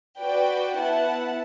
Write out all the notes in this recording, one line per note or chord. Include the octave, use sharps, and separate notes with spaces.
F#4 B4 D5 G5
B3 E4 B4 F#5 A5